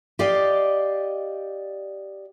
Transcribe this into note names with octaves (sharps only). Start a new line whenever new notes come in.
G4 D5 D#5 F5 G5